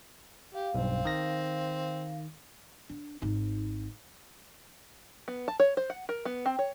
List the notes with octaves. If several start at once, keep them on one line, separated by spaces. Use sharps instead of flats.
G4 F5
B1 G2 C4
D#3 A#6
D4
G#1 D#4
B3
A5
C#5
C5
F#5
A#4
B3
C4
C#5